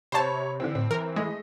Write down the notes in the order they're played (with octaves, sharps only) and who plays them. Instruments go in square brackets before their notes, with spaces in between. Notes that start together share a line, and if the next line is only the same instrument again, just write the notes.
[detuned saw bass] C3 [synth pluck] C5 A5 [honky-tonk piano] C#5 B5
[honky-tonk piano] D3 E3 C4
[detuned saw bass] A2 [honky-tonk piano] C4
[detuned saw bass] E3 [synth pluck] A#4
[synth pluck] G#3 [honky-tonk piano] A3 D#5